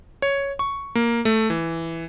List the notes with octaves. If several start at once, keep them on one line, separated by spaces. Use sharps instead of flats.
C#5
C#6
A#3
A3
E3